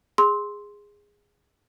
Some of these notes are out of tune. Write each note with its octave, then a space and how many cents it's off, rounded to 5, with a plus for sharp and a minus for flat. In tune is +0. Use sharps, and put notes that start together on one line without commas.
G#4 -15 C6 +0 E6 -30